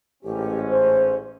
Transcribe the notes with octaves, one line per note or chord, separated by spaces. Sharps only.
A1 G#2 C#4 G4
C5